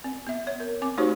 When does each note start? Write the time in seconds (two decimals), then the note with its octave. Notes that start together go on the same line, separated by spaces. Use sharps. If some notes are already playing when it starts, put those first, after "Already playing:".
0.04 C4
0.27 B3 E5
0.47 C#5
0.60 A#4
0.82 C4 D6
0.98 A3 D#4 F#4 G4 C5 C#5